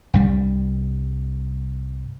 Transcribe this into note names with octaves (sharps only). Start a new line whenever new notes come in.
C2 G2 G3